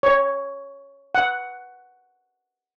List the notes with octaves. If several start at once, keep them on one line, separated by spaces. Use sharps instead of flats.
C#5
F#5